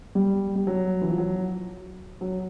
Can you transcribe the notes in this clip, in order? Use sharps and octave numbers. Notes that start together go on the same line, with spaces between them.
G3
G3
F#3
E3
F3
F#3
F#3